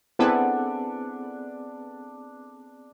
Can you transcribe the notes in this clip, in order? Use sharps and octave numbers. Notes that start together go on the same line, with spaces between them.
B3 C4 D4 E4 G#4 A4 B4 F#5